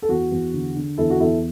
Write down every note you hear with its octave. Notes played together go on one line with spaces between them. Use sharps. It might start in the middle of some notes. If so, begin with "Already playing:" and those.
A4
E2 F#4
E2
D3
D3
E2 E4 A4
F#4
E2 E4 A4